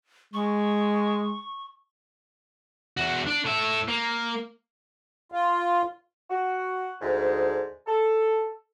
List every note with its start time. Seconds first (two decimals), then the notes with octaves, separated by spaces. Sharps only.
0.34 G#3 C#6
2.97 E2 F#4
3.27 D4
3.45 A2 E5
3.88 A#3
5.32 F4
6.30 F#4
7.01 D2 G#2
7.87 A4